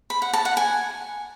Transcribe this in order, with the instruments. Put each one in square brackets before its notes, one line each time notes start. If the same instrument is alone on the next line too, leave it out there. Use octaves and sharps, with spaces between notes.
[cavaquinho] B5
F#5
A5
F#5
G#5